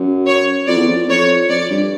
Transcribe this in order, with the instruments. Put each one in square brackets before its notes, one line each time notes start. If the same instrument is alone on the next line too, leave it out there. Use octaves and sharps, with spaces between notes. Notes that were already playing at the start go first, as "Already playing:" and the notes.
Already playing: [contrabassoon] F#2
[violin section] C#5
[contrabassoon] F2 [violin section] D5
[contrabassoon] E2
F2
[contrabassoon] F2 [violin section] C#5
[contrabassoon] F2 [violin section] D5
[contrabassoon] G2